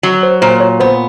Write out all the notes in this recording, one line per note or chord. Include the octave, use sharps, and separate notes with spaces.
F#3
C5
A#2 C5
C#5
B3 C5